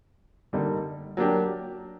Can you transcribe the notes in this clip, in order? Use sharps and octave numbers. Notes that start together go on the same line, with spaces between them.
D3 G3 A#3 D#4
F#3 A#3 D4 G4